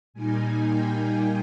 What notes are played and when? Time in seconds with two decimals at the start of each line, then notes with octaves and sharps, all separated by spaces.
0.14 A#2 G3 A#3 D#4 G#5
0.66 G5